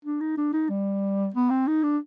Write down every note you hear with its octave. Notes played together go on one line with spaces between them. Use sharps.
D4
D#4
D4
D#4
G3
B3
C4
D#4
D4